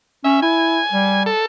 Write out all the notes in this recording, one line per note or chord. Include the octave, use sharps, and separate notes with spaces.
C#4 E5
E4 G#5
G3
A4